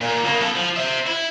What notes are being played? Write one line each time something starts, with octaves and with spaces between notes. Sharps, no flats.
A#2
C#3 A#3
B3 A4
F3
C5 E5
E4